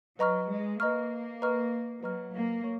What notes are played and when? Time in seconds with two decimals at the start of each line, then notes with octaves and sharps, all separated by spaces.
0.19 F#3 B4 D#5 A#5 C#6 F6
0.50 G#3
0.80 A#3 B4 D#5 A#5 C#6 F6
1.42 B4 D#5 A#5 C#6 F6
2.03 F#3 B4 D#5 A#5 C#6 F6
2.34 A#3
2.64 C#5 C#6